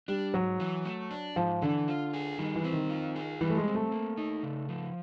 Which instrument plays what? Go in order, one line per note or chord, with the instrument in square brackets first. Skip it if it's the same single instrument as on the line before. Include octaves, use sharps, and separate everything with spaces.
[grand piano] G3 [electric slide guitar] D4
[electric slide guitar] G#2 [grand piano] F#3
[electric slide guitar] E3
A3
D4
[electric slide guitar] G#2 [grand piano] F3
[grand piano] D3 [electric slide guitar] E3
[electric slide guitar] F4
G#4
[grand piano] D#3 [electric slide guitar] G3
[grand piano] E3
[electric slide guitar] C4
[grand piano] D#3
[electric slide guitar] F4
G#4
[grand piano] E3 [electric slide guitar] G3
[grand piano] A3
G#3
[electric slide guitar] C4
[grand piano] A3
[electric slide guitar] A#3
D#4
C#3
F3